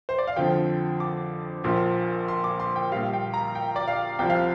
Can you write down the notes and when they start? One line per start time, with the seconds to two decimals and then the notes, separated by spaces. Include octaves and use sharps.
0.09 C5
0.18 D5
0.27 F5
0.36 F2 D3 F3 G5
1.00 D6
1.64 A#1 A#2 F3 C6
2.28 C6
2.44 D6
2.60 C6
2.76 G5
2.92 A#1 A#2 G3 F5
3.13 G5
3.34 A#5
3.55 G5
3.76 D5
3.88 F5
4.19 C2 C3 F3 G5
4.30 F5